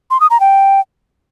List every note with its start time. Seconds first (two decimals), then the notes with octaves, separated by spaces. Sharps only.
0.11 C6
0.21 D#6
0.30 A#5
0.40 G5